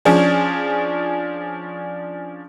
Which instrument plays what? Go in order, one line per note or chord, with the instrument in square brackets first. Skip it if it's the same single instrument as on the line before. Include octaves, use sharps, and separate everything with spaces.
[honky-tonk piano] F3 C#4 D4 G#4